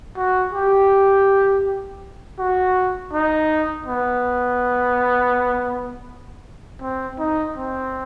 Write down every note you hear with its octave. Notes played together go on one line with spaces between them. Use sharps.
F#4
G4
F#4
D#4
B3
C4
D#4
C4